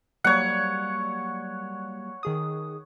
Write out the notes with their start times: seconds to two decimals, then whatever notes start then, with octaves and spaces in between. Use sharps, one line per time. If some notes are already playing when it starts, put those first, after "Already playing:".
0.24 F#3 G3 A#3 C#5 F#5
2.23 D#3 G#4 D#6